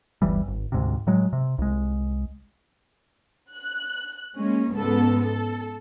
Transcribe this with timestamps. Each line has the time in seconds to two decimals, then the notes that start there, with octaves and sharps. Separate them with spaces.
0.22 D1 G1 E3 G3
0.47 G#1
0.72 D2 G#2 C3
1.07 A2 F#3 G#3
1.33 C3
1.58 C2 G#3
3.53 F#6
4.37 G#3 A#3 C#4
4.73 C#2 G#2 B3 A4
5.23 A4